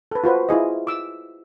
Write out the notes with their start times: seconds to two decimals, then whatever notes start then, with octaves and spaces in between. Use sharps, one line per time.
0.11 A4 B4
0.24 F4 F#4 B4 C5
0.49 E4 F4 G#4 D#5
0.87 D6 E6